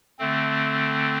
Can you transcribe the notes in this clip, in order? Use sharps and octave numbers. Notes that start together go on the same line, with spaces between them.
D3 A3 C4